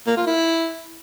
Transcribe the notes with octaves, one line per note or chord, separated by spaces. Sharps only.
A#3
F4
E4